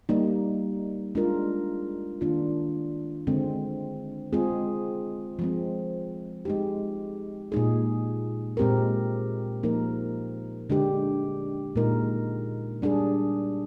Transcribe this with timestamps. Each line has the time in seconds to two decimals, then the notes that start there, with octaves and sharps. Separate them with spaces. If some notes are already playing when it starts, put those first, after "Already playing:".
0.09 G3 A#3 D#4
1.15 G#3 D4 F4 A#4
2.21 D#3 A#3 D4 F4
3.27 D3 G#3 C4
4.33 G#3 C4 F4 G#4
5.39 F3 G#3 C4
6.45 G#3 D#4 G4
7.52 A#2 G#3 D#4 G#4
8.57 A#2 G#3 C4 G4 A#4
9.63 F3 A#3 D#4 A#4
10.70 D3 G#3 D4 G4
11.76 A#2 G#3 D#4 A#4
12.82 G3 D4 G#4